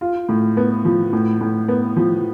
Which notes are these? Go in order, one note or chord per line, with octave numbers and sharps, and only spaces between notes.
F4
A2
B3
F3
A2
A2
B3
F3